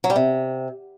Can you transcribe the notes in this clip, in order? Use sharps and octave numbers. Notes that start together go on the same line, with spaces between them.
F#3
G3
C3